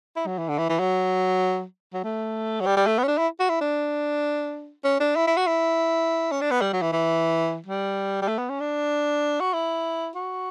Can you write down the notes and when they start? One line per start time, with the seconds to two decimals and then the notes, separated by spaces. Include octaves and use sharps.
0.16 E4
0.27 F#3
0.38 E3
0.48 D3
0.58 E3
0.69 E3
0.79 F#3
1.94 F#3
2.04 A3
2.61 F#3
2.66 G3
2.77 G3
2.87 A3
2.98 B3
3.03 C#4
3.08 D4
3.18 E4
3.40 F#4
3.49 E4
3.61 D4
4.84 C#4
5.00 D4
5.16 E4
5.27 E4
5.37 F#4
5.47 E4
6.32 C#4
6.41 D4
6.51 B3
6.61 G3
6.73 F#3
6.82 E3
6.92 E3
7.66 G3
8.22 G3
8.28 A3
8.38 B3
8.50 C#4
8.60 D4
9.41 F#4
9.53 E4
10.15 F#4